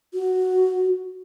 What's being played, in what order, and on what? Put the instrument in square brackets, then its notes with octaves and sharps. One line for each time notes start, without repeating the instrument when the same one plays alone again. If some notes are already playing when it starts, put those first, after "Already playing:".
[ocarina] F#4